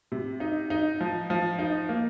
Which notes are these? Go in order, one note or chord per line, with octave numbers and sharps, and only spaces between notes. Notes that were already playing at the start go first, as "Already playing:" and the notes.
C3
D#4
D#4
F3
F3
D#4
A#3